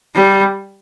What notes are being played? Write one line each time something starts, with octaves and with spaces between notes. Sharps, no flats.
G3